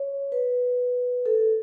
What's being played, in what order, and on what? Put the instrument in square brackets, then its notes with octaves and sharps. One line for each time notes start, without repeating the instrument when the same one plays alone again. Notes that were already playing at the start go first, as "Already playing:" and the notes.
Already playing: [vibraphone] C#5
B4
A4